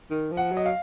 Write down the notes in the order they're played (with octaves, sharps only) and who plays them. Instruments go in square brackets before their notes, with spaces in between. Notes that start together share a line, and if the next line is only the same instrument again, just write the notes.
[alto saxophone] D#3
F3
[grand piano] F#5
[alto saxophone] F#3
[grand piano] D#5
F5